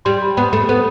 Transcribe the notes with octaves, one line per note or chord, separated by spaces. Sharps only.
G3 C6
B5
B3 B5
A3 B5
B3